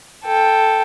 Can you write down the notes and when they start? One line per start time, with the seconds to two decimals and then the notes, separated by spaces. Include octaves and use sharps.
0.25 A4 G5